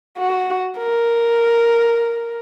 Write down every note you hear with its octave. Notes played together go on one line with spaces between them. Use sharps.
F#4
A#4